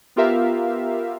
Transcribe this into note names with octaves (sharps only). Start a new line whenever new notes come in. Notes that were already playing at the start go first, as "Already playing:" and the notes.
B3 F4 G4 A#4 E5 F5